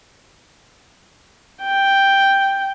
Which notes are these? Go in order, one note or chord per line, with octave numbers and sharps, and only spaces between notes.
G5